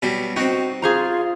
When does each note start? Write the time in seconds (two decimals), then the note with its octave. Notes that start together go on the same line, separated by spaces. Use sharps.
0.02 B2 F#3 G3
0.36 C4 D#4 F#4 G5
0.82 F4 G#4 C5 A#5